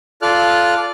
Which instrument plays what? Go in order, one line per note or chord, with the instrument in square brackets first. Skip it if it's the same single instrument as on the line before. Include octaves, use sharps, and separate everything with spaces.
[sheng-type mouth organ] F4 A4 D5 F6 F#6